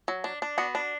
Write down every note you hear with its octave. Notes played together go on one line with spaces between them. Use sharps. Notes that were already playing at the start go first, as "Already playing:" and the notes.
F#3
D4
D4
B3 F#4
D4